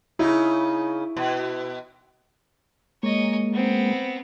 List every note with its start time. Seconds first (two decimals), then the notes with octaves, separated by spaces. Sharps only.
0.19 C#3 D#4 E4
1.17 B2
3.03 G#3 A#3 C#5 D#5
3.53 B3 C4